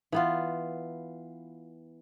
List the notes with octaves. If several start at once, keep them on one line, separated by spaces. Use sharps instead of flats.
E3 B3 F4